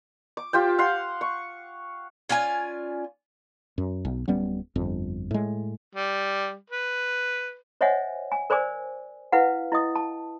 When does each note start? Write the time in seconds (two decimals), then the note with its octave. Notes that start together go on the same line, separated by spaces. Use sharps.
0.37 D6
0.53 F4 G4 C5 G5
0.79 F5 F#5 C6
1.21 C#6
2.29 C#4 F4 D5 G#5
3.78 F#2
4.05 B1
4.28 D1 G3 B3 C#4
4.76 G1 F2
5.31 A2 G#3
5.95 G3
6.70 B4
7.81 C5 C#5 D#5 E5 F#5 G#5
8.32 G#5
8.50 A#4 C5 D5 G#5 D6
9.32 E4 B4 F5 F#5
9.72 E4 D#5 D#6
9.96 A5